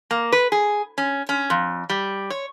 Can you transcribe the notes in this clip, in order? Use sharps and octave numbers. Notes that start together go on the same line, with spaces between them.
A#3
B4
G#4
C#4
C#4
F2
G3
C#5